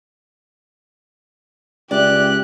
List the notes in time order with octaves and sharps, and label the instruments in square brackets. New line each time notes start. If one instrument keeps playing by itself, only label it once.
[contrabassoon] C#2 [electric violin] G4 F#6 [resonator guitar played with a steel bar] D5 E5